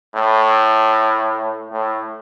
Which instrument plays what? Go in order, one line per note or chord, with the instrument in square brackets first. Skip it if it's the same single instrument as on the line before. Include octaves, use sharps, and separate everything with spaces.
[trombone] A2
A2